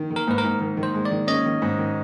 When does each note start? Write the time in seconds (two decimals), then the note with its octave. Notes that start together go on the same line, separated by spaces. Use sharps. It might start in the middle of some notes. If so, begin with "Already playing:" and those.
Already playing: D#3
0.11 D#3
0.16 A#4
0.27 G#2 B4
0.38 A#4
0.44 G#2
0.61 D#3
0.77 D#3
0.83 C5
0.94 G#3
1.05 D5
1.11 D#3
1.27 C#4 D#5
1.45 D#3
1.62 G#2
1.78 D#3